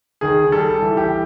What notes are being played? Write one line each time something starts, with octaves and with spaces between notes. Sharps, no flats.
D#3 G#4
G3 A4
E3
G4